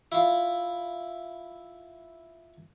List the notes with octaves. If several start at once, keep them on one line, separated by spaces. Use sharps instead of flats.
E4 F4